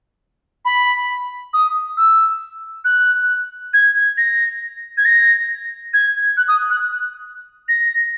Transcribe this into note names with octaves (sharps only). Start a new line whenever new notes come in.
B5
D#6
E6
F#6
G#6
A#6
G#6
A#6
G#6
F#6
D#6
F#6
A#6